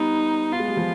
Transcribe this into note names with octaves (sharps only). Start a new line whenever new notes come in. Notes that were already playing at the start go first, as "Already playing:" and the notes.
Already playing: G3 B3 D#4
B3 F4
G#3
G3
F3 G#3